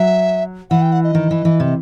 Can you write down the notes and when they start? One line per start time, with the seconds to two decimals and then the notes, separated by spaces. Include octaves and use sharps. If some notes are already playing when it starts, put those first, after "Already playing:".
Already playing: F#3 E5
0.70 E3 F#5
0.82 G5
0.92 F#5
1.04 D#5
1.15 D#3
1.31 E3
1.45 E3
1.60 C3